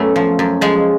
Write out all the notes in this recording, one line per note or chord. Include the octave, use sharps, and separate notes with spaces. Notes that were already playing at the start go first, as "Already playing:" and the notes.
Already playing: F#2 A3 B3 C#4
F3
F#2
F3 G#3